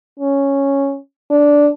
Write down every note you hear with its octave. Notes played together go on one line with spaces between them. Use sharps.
C#4
D4